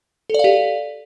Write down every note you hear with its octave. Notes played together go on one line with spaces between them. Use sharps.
G4 A4 D5 F5